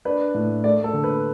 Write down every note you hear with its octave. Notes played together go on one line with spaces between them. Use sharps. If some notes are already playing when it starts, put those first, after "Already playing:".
D4 B4
A2
A3 D5
A4
D3
B4